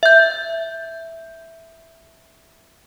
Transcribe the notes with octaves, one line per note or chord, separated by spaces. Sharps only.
E5 G6